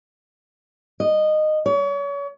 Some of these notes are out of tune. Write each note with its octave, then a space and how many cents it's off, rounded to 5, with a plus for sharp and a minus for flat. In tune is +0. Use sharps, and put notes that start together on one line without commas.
D#5 -15
C#5 +35